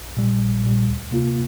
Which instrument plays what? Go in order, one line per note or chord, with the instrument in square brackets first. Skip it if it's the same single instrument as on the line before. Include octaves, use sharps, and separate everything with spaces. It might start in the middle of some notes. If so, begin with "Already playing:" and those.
Already playing: [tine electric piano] A#1
A#2 G3
A#1
A#2 G3
D2
C3 A#3 F4